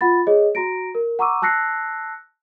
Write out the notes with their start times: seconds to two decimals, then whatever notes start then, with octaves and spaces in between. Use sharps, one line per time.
0.01 F4 F#5 B5 A6
0.27 G#4 C#5 D#5
0.55 F#4 A#5 A#6 D7
0.95 A#4
1.19 F#5 A#5 C#6 D6 E6 D#7
1.42 A5 E6 F#6 A#6 C7 C#7